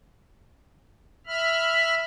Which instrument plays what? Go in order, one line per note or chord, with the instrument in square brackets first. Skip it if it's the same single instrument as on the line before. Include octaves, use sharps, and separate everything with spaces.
[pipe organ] E5 B5 F6